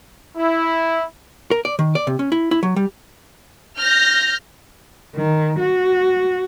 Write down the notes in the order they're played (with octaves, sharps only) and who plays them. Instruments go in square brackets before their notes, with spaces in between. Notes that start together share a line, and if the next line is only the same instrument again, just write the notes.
[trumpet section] E4
[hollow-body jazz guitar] A#4
D5
D#3
D5
C3
C#4
E4
E4
F#3
G3
[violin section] F6 G6 A#6
[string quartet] D#3
F#4